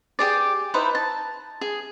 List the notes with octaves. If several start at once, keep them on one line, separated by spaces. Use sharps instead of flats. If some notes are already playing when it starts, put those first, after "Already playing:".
G4 G#4 D5
D#4 E4 B4 C5
A5
G#4